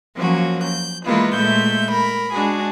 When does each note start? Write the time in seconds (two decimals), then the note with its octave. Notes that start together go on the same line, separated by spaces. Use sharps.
0.16 F3 F#3 A#3 C#4 F#4
0.63 G6
1.04 E3 G#3 A#3 B3 E4 F4
1.34 A#2 G#3 A3 E5 G6
1.90 A#4 B5
2.31 G#3 D4 F#4 G#4